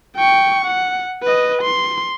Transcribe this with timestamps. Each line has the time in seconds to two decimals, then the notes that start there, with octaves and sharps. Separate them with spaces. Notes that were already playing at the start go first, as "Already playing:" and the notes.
0.16 G5 C#6
0.65 F#5
1.23 B4 D#5
1.62 C6